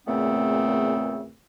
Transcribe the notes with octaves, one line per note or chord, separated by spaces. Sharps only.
E2 A#2 C#3 A3 B3 C4